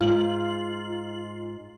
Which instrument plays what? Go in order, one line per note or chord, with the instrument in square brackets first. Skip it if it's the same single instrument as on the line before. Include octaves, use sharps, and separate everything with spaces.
[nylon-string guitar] G#2 [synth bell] F4 F#7